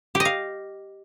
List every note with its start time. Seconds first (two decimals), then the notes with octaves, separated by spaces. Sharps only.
0.15 G4
0.20 D#5
0.25 F5